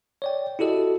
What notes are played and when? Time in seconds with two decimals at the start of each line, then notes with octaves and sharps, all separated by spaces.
0.22 C#5 D5 G5
0.59 E4 F#4 G4 A4 D#5